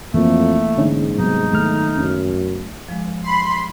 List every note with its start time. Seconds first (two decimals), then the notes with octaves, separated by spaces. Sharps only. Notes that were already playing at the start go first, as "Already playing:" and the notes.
0.14 F2 E3 A3 A#3
0.78 G#2 D3 C#4 D#4
1.19 C3 F#3 G3 B3 D#4
1.53 D#3 A3 F6
1.98 F#2 F#3 C#4
2.89 F3 G#3
3.23 B5 C6